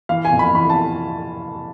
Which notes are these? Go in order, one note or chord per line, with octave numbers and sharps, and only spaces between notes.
E3 F5
G#5
F2
B5
E3 B5
A5